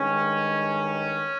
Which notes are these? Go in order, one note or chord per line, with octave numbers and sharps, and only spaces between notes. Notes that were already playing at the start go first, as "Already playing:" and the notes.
Already playing: G2 D#3 G#3 C#4